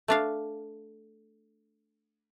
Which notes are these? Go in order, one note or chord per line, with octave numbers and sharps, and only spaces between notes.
A3 D4 F5